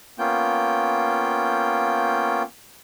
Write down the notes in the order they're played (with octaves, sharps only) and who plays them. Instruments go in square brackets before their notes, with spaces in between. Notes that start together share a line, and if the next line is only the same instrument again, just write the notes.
[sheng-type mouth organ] A#3 B3 C#4 F4 G5 G6